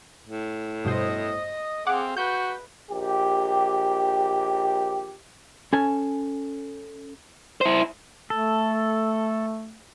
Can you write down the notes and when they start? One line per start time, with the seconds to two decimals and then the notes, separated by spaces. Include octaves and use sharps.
0.23 A2
0.85 G2 B2 C5 D#5 D#6
1.87 C4 G#4 F5 F#5 D6
2.17 F#4 B4 G6
2.91 A#1 G4
5.73 C#4 A4 G#5
7.61 E4 C5
8.30 A3 A4